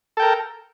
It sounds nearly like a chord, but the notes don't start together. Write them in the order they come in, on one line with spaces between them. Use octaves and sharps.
A4 G5 A#4